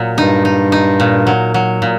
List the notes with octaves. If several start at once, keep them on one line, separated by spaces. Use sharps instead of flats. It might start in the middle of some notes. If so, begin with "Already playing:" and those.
Already playing: A#2 F#3
G2 D#4
D#4
D#4
A#2
F#3
F#3
A#2